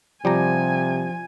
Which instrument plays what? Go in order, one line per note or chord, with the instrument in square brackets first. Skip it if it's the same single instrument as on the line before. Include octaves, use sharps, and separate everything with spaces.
[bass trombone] C3 [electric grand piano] F3 [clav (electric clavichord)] G3 G4 A#5 [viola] G#5